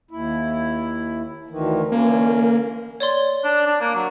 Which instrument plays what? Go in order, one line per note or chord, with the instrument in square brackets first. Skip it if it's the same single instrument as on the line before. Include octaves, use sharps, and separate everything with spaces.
[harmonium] D#2 E4
D2 D#3 E3
[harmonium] D3 E3 C#4 [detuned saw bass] A#3
[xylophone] C#5 D5 C6
[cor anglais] D4
D4
A#3
F#3